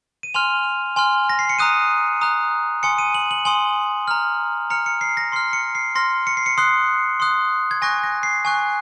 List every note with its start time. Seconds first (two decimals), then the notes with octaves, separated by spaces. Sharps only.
0.23 D#7
0.34 G#5 C6 F6 F7
0.96 G#5 C6 F6
1.29 A#6
1.39 C7
1.49 C#7
1.58 A#5 D#6 F#6 D#7
2.21 A#5 D#6 F#6
2.83 G#5 C6 D#6 C#7
2.98 D#7
3.14 F#7
3.31 F#7
3.45 G#5 C6 D#6 F#7
4.08 A#5 F6
4.70 A#5 F6 C#7
4.86 C#7
5.01 C7
5.17 A#6
5.32 C6 F6 C7
5.53 C#7
5.75 C7
5.95 C6 F6 A#6
6.27 C#7
6.37 C7
6.46 C#7
6.58 C6 D#6 F#6 C7
7.20 C6 D#6 F#6
7.71 G#6
7.82 G#5 C#6 F#6 A#6
8.03 A#6
8.23 C7
8.45 G#5 C#6 F#6